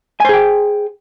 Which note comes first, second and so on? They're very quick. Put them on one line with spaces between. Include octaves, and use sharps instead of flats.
G#5 C5 G#4 G5